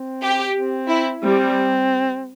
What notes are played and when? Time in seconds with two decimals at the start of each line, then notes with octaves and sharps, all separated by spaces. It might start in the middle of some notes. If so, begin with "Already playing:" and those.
Already playing: C4
0.22 G4
0.55 C4
0.88 E4
1.22 G3 C4